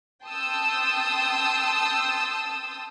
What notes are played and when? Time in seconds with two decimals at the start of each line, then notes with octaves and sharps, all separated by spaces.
0.25 G5 A5 C6 D#6 E6